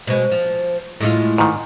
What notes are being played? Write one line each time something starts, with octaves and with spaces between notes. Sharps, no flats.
B2 G#3 C5
F3
A2 G#3 E4 F4
G#2 D#3